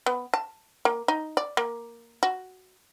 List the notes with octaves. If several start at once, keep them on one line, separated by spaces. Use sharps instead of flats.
B3
A5
A#3
D#4
D5
A#3
F#4